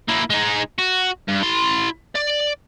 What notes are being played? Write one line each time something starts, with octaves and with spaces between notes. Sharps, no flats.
A#3 E4
G#3 D#4
F#4
G2
E4 C6
D5